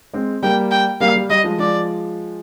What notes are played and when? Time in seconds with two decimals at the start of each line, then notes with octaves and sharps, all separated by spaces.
0.13 G#3 C4
0.43 G3 A#3 G5
0.71 G5
1.00 G3 A#3 F5
1.16 G3
1.30 G3 D#5
1.44 F3 G#3
1.58 F3 G#3 D5